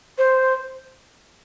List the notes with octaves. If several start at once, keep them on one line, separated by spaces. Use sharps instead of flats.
C5